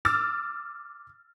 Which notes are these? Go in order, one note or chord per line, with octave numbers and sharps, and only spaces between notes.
D6 E6 F6 A6